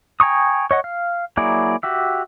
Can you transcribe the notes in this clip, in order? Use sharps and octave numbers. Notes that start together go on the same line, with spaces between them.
G5 G#5 A#5 C#6 D#6
C#5 D#5 F#5
F5
F#3 A#3 E4 G#4 D5
F#4 G4 E5